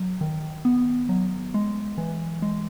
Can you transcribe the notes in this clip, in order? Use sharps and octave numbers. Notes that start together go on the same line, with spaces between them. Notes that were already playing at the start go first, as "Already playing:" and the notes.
Already playing: F#3
D#3
B3
F#3
G#3
E3
G#3